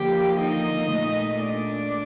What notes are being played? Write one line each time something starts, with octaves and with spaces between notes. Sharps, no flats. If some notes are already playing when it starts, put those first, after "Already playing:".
Already playing: D3 F3 A#3 G4 G5
D#4 D#5
A#2 A3
D4 D5